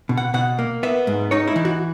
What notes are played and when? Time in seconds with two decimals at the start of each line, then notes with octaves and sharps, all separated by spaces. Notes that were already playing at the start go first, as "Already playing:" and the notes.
0.09 B2
0.18 F#5
0.34 B2 F#5
0.59 A#3
0.83 B3 E5
1.07 G#2
1.31 D#4 C#5
1.48 E4
1.56 E3
1.65 F#4